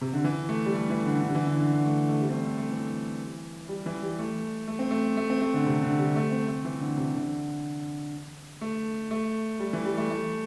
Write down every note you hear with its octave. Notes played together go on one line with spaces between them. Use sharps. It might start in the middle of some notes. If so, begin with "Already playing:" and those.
C3
D3
E3
A3
G3
A3
E3
D3
D3
E3
D3
D3
D3
A3
A3
G3
C4
A3
A3
A3
E3
G3
E3
G3
A3
A3
C4
A3
A3
C4
A3
D3
C3
D3
G3
A3
C4
A3
E3
D3
C3
D3
A3
A3
G3
E3
G3
A3
A3